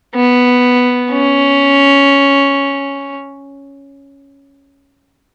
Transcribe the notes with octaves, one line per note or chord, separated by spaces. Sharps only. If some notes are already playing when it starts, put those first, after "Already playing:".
B3
C#4